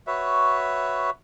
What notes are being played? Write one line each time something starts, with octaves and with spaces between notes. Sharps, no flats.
F#4 B4 C#5 E5